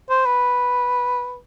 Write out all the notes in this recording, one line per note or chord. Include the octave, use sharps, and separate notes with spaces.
C5
B4